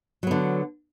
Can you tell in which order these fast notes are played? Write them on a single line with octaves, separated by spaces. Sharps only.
F#3 B3 D3